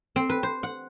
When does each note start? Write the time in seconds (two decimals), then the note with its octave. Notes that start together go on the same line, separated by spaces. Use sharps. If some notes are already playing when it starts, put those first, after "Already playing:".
0.16 C4
0.30 B4
0.43 C5
0.63 F#5